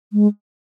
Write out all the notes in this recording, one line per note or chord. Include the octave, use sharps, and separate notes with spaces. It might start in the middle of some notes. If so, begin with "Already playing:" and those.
G#3